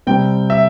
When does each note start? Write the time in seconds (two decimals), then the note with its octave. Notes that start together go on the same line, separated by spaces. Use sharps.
0.07 C3 G3 C4 G5
0.50 E5